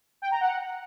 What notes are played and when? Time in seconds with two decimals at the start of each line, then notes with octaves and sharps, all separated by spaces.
0.22 G5
0.31 A#5
0.41 F#5